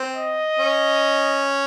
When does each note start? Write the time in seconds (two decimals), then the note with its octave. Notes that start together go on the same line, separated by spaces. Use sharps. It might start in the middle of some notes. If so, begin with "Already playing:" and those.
Already playing: C4
0.15 D#5
0.59 C#4